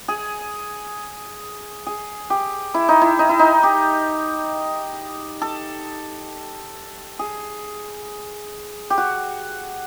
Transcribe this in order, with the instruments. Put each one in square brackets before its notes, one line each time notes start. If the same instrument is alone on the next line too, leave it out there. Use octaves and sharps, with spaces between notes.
[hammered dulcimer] G#4
G#4
G4
E4
D#4
E4
D#4
E4
D#4
G4
A4
G#4
G4
F#4